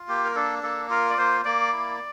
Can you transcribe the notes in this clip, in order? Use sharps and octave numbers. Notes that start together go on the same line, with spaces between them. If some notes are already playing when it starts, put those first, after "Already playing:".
Already playing: F4
A#3 G4
A#4
D4 A4
A#3 A4
F4 A#4
D5
A#3 C5
A#3 D5
E4